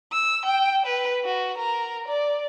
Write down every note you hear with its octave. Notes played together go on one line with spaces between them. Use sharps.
E6
G5
B4
F#4
A#4
D5